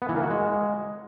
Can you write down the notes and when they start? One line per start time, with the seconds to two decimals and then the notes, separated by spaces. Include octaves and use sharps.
0.02 B3
0.09 E3
0.16 A#3
0.23 F#4
0.30 G#3